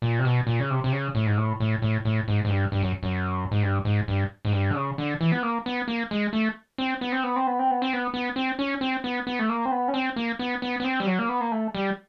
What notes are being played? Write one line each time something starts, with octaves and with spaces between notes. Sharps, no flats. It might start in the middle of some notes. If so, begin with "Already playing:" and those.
A#2
C3
B2
A#2
C#3
C3
C3
C#3
A2
G#2
A2
A2
A2
A2
G#2
G#2
G2
G2
F#2
F#2
G#2
G2
G#2
G2
G#2
G2
D3
C#3
D3
E3
B3
A#3
B3
A#3
G#3
A3
C4
B3
C4
B3
C4
B3
C4
B3
C4
B3
B3
C4
C#4
C4
B3
B3
A3
A#3
C4
B3
C#4
C4
A#3
B3
B3
B3
C4
G3
F#3
A#3
B3
A#3
A3
G3